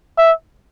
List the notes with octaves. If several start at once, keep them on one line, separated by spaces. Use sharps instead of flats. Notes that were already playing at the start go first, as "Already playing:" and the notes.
E5